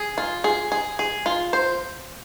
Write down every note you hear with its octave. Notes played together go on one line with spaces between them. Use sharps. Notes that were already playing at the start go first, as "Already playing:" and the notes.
Already playing: G#4
F4
G#4
G#4
G#4
F4
C5